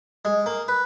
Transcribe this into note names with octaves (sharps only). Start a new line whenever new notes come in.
G#3
A#3
B4